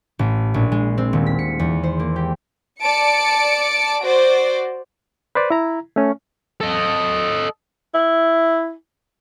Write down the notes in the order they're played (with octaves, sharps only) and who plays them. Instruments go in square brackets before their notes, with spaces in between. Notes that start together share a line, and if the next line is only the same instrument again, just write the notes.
[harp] A1
A#1
G#3
C4
D#1
B6
C#7
E2
C5
A#3
G4
[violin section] D5 A5 C#7 D7
F#4 C5 D5
[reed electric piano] B4 C5 D5
E4 A#5
A3 C#4
[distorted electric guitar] A4 D#5
[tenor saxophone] E4